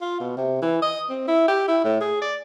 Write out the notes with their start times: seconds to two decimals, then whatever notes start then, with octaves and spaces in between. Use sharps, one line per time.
0.01 F4
0.20 B2
0.37 C3
0.62 E3
0.82 D#5
1.10 C4
1.28 E4
1.48 G4
1.68 E4
1.84 A2
2.01 G#4
2.22 D5